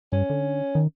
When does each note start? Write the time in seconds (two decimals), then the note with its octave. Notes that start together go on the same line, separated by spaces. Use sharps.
0.12 G2 C#4
0.30 D3
0.75 D#3